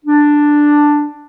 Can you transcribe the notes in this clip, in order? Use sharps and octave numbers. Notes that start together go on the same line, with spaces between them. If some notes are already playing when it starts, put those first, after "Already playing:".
D4